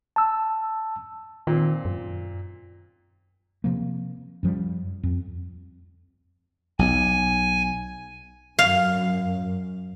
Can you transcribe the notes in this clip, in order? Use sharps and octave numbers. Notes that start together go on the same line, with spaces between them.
A5 E6
A#2 D#3 C4
F#2
C3 F3 A#3
F#2 F3 G3
F2
B1 G#5
F#2 F5